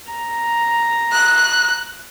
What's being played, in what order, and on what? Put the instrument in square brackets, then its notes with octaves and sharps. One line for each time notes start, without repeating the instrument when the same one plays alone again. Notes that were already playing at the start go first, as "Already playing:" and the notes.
[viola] A#5
[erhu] F#6